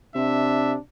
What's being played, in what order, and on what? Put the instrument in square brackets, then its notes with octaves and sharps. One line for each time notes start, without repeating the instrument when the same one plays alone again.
[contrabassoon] C3 [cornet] D4 [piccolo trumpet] E5